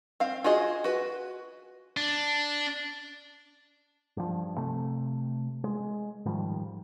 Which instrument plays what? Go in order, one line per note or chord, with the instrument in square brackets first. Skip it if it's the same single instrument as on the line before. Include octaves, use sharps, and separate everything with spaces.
[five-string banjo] C4 F5
F4 F#4 G#4 D#5
F#4 B4
[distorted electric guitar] D4
[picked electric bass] G2 F3
C3 A3
G#3
G#2 D#3 F3 G3